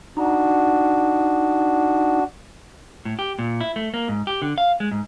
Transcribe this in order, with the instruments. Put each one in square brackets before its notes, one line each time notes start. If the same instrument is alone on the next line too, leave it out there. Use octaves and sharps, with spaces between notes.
[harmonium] D4 F#4 [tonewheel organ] D#4
[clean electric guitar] A2
G4
A#2
E4
A3
A#3
G#2
G4
D3
F5
G#3
G#2